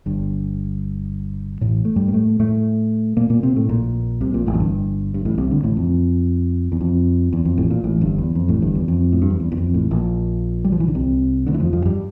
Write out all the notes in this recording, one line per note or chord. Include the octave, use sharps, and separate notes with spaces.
G1 G2
A1 A2
A3
G2 G3
A#3
A2 A3
A2 A3
A#2 A#3
A#2 A#3
C3 C4
A2 A3
A#1 A#2
C2 C3
A#1 A#2
A1 A2
F2
G1 G2
G2
A1 A2
C2 C3
D2 D3
A1 A2
F2
E2
F2
E2
F2
A1 A2
A#1 A#2
A1 A2
G1 G2
E2
F2
A1 A2
G1 G2
E2
F2
A2
G2
F2
E2
E2
F2
A1 A2
A#1 A#2
G3
F3
E3
D3
C2 C3
D2 D3
E3
F2 F3
F2 F3
G2 G3